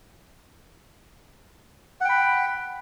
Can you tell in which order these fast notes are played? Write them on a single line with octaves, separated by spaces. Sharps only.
F#5 G5 B5